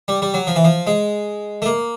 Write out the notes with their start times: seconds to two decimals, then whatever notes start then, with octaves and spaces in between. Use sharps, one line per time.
0.08 G3
0.22 G3
0.34 F#3
0.47 F3
0.56 E3
0.64 F3
0.87 G#3
1.62 A3
1.66 A#3